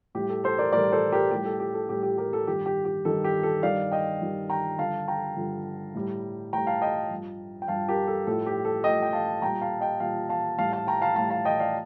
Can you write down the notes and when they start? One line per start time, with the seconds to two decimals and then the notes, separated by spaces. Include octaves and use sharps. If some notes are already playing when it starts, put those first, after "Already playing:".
0.15 A2 G3 G4
0.29 A4
0.44 A4 C5
0.58 A#4 D5
0.73 A2 G3 A#4 D5
0.92 A4 C5
1.12 G4 A#4
1.31 A2 G3 G4
1.45 A4
1.60 G4
1.74 A4
1.89 A2 G3 G4
2.03 G4
2.18 G4 A#4
2.33 A4
2.47 G2 D#3 G3 G4
2.66 G4
2.85 G4
3.05 G2 D#3 G3 A4
3.24 G4
3.43 A4
3.63 G2 D#3 G3 D5 F5
3.92 D#5 G5
4.21 G2 D#3 G3
4.50 G5 A#5
4.78 G2 D3 F3 F5 A5
5.08 G5 A#5
5.36 G2 D3 F3
5.94 A2 G3
6.53 A2 G3 G5 A#5
6.67 F5 A5
6.82 D#5 G5
7.10 G2 F3
7.62 G5
7.68 G2 F3 F5 A5
7.88 G4 A#4
8.07 A4
8.27 A2 F3 A4
8.46 G4
8.65 A4
8.84 A2 F3 D#5 G5
9.02 G5
9.13 F5 A5
9.42 A#2 G3 G5 A#5
9.61 F5 A5
9.81 D#5 G5
10.00 A#2 G3 F5 A5
10.29 F5 A5
10.58 A2 G3 F5 A5
10.72 F5 A5
10.87 G5 A#5
11.02 F5 A5
11.16 A2 G3 F5 A5
11.30 F5 A5
11.45 D#5 G5
11.60 D5 F5